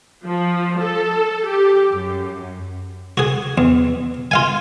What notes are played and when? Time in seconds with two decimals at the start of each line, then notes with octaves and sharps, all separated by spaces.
0.25 F3
0.79 A4
1.47 G4
1.92 F#2
3.17 F#4 G#4
3.58 E2
4.31 F4 F5 G#5